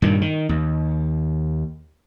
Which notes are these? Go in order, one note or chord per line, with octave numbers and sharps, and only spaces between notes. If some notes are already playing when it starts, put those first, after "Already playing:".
G2 A#2 D#3
D#3
D#2